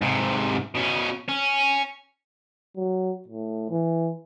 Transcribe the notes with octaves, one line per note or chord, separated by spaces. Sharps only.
G#2 C3
B2 C#4
C#4
F#3
A2
E3